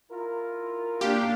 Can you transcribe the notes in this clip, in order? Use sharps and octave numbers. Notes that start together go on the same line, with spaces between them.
E4 F4 A#4
A#3 D4 G4 F5